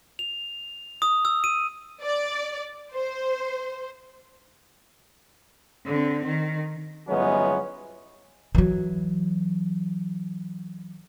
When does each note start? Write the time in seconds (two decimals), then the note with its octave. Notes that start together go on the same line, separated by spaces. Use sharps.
0.19 F7
1.02 D#6
1.25 E6
1.44 D#7
2.03 D5
2.94 C5
5.85 D3 C4
6.25 D#3
7.09 G1 E3 F#3 G#3 B3 C#4
8.55 E3 F#3